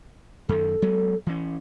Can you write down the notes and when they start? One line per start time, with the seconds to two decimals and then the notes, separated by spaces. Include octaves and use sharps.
0.49 F#2 D#3 A4
0.82 F#3 G#3 B3
1.26 E3 C#4